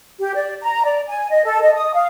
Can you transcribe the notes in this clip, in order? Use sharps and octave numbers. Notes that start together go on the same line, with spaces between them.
G4
D5
A#5
D5
G#5
D#5
A4
D#5
D#6
F5